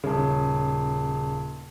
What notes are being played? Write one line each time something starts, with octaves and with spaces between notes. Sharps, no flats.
D#1 C#3